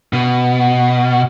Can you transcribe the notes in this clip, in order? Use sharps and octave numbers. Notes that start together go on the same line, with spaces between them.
B2